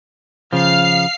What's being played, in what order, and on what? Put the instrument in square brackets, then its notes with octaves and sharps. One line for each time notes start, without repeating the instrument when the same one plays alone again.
[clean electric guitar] C#3 F3 [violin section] F5 F6 C7